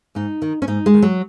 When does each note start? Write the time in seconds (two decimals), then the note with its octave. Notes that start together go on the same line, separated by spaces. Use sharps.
0.15 G#2 D#4
0.42 D#3
0.62 C#4
0.67 G#2 D#4
0.86 G#3
0.94 D#3
1.02 F#3